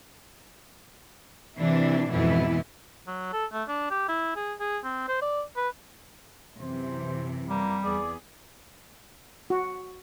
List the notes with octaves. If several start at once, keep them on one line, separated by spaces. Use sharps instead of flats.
C3 E3 D4 E4
F2 G#2 B2 E3 B3 E4
F#3
A4
A3
D4
G4
E4
G#4
G#4
C4
C5
D5
B4
F#2 C3 E3 C5
G3 A#3
E2 B3 G#4 D5
F#4